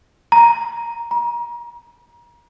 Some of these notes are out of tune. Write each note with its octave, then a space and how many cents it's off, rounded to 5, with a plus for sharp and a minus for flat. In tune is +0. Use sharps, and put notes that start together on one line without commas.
A#5 +5
A#5 +30